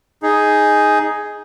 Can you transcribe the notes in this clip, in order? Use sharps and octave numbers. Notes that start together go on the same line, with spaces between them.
D#4 G#4